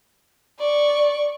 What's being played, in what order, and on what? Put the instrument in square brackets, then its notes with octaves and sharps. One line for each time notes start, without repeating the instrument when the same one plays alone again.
[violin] D5 C#6